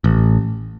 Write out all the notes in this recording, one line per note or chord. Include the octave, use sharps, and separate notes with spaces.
A1